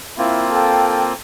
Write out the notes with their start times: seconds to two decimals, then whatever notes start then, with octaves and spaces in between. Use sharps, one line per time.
0.18 A#3 C4 E4 F4
0.53 A4 G5